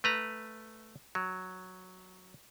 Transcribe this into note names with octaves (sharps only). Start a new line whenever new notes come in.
A3 B4 A#5
F#3